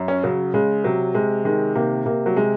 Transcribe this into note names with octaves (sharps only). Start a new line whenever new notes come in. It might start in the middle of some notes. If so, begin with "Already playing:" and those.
Already playing: F#2
C#4
C#3 F#3
C#3 G#3
C3 F#3
C3 G#3
D#3 G#3
C3 A#3
C3 A#3
F#3
C3 G#3